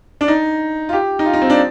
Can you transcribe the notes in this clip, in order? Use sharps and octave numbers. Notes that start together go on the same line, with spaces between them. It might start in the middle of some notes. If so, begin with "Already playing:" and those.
D4
D#4
F4
G4
D#4
F4
D#4
C4
D4